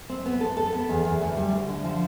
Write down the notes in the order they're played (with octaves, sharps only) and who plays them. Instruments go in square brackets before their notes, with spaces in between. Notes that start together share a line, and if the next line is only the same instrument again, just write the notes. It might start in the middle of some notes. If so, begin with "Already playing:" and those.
[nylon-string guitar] C4
B3
A4
A4
B3
E2
E2
D2
G3
D2
D3
F3